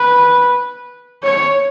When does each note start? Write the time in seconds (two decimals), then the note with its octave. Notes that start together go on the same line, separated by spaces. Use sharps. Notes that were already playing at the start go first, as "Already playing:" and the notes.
Already playing: B4
1.23 C#5